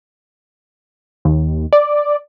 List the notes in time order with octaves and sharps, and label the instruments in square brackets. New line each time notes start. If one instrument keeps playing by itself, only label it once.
[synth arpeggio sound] D#2
D5